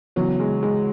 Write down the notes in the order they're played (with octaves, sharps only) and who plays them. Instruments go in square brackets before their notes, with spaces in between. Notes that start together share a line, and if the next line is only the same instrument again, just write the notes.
[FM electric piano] C#3 E3 B3 E4 [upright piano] F#3
[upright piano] G#3
G#3